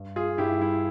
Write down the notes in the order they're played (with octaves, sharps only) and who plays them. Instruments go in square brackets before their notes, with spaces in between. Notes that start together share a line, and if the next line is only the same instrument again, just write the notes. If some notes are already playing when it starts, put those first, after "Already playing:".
Already playing: [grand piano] G2
F4 G#4
G2 E4 G4
E4